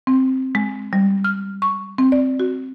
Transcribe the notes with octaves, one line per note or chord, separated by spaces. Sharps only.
C4
G#3
G3
F6
C#6
C4
D5
F#4